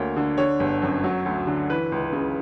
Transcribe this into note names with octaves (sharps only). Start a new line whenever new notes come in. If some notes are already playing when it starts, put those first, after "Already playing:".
Already playing: D2 A#3 C#5
D3
D3 C#5
G1
F#2
F#3
D2
D3
E3 B4
C#2
C#3